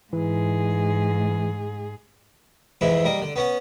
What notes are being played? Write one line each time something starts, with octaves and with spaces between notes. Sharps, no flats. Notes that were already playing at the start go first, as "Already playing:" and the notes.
G#2 E3 G#4
F2 G#2 E3 G#3 E4
G3 A#3 D#5
D3
B3 C#4 F#5